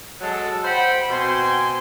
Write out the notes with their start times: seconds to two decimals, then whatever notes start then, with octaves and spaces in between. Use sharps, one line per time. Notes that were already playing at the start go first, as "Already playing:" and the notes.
0.21 F#3 G#3 A4
0.64 C5 F#5 G5 B5
1.09 B2 C4 C5 G#5 C6